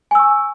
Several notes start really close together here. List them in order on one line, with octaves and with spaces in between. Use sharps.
G#5 E6 C#6